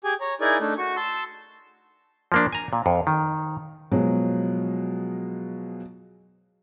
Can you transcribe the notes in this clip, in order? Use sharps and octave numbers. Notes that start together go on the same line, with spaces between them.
G4 G#4 G#5
C#5 A#5
D#4 E4 G#4 A#4 D5 G#5
A3 D4 D#4
F#4 C#6
A5 C6 E6
F3 A#3 D4
G#5 A#5
A#2
F2
D#3
B2 F3 F#3 G#3